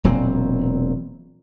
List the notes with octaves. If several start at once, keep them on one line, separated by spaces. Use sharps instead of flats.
E1 A#2 F#3 C4